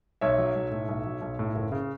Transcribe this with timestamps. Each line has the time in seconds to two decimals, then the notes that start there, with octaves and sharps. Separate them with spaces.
0.21 B1 C#5 E5
0.38 F#3
0.55 B1
0.71 A2
0.89 B1
1.06 F#3
1.22 B1
1.39 A2
1.56 F#1
1.72 C#3